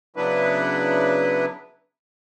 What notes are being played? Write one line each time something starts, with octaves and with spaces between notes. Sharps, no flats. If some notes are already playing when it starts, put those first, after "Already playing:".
C#3 F#3 B3 D4 E4 B4